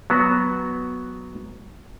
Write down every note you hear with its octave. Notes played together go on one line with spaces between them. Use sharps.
F#3 B3 F#4